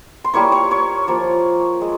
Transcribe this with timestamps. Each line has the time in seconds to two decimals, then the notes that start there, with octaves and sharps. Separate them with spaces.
0.24 C6
0.34 G3 A#3 E4 C#5 C#6
0.52 C#5 C#6
0.71 C#5 C#6
1.07 F3 A#3 F4
1.81 G#3